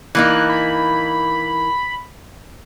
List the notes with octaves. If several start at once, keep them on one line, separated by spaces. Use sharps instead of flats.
E3 A#3 D#4 F#6
B5